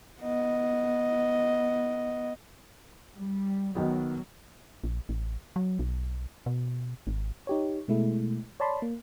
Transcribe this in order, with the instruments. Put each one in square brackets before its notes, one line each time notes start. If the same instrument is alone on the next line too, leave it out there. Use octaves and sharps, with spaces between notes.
[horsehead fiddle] B3 D#5
[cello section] G3
[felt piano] B1 D#3 B3 [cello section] F#3
[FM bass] A#1
A1
F#3
B1
B2
G#1
[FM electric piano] D#4 G4 C#5
B2 G#3 A3 E4
C#5 D5 A5 B5 C6
A#3